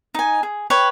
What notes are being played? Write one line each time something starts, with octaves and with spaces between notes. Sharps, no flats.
D#4 G#5
G#4
B4 C#5 G5